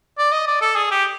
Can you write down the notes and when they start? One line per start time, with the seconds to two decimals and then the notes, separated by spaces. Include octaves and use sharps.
0.18 D5
0.32 D#5
0.47 D5
0.62 A4
0.76 G#4
0.91 G4